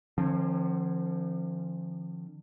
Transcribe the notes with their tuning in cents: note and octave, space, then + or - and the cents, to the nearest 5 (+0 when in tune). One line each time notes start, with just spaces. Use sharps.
D3 +35 F3 -20 C4 +45